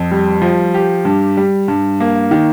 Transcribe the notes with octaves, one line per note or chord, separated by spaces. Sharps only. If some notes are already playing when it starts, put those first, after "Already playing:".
Already playing: F2
G3
F3
G4
G2
G3
G2
A#3
D#3